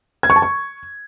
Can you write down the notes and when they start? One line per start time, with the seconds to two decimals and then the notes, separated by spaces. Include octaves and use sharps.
0.23 G#6
0.30 C#6
0.36 A5
0.42 C#6